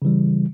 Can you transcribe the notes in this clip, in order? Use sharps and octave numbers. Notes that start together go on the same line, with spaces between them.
C#3 E3 G3